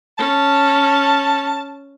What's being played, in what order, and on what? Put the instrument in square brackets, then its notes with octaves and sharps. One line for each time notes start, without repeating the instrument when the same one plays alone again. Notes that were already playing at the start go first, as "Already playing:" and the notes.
[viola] C#4 [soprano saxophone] A5